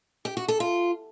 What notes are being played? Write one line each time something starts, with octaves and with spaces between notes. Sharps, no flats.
G4
F#4
A4
F4